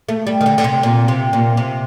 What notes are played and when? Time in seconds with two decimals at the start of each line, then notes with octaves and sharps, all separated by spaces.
0.09 A3
0.27 G3
0.41 D#3
0.46 D3
0.58 D3
0.64 C3
0.83 A#2
1.08 C3
1.33 A#2
1.57 C3